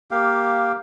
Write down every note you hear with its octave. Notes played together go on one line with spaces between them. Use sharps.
A#3 G4 F5